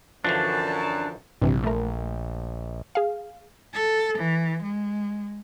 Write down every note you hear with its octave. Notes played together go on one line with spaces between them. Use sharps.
F#2 D3 E3 F3 D4 A5
A#1 G2 C3 E3
A3 A#4
G#4 F5
A4
E3
G#3